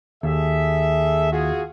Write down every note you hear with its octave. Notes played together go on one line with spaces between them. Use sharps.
D#2 G#4 A4 E5
F4 F#4 G#4